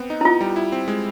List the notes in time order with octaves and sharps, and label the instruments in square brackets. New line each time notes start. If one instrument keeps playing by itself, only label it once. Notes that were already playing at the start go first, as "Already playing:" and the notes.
Already playing: [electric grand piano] B3 C4
D#4
[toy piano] E4
[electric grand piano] B3 [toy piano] F4
[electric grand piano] G3
E4
C4
G#3